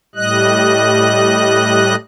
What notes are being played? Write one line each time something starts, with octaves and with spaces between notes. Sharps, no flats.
A2 G3 D#5 F#6